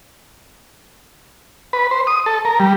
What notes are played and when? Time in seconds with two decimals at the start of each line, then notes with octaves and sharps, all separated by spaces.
1.73 B4
1.91 C5
2.07 D#6
2.26 A4
2.45 A#4
2.60 G3